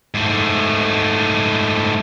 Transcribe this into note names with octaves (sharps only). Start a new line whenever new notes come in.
G#2 A3